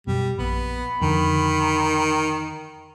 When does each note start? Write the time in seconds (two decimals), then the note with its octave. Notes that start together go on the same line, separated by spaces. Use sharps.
0.07 F#2 B2 G3
0.39 A#1 B3 B5
1.01 F2 D3 D#3